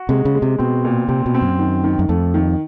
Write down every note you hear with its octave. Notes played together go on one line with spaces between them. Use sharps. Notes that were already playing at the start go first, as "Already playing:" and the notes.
Already playing: F#4
C3 G#3
C#3
G#3
C3
B2 C4
A#2
C3 C4
B2
C4
F#2
D#3
D#3
F#2
F2 A3
D#3